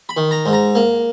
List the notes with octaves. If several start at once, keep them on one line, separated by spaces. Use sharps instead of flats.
B5
D#3
A#5
G#2
A#5
A#3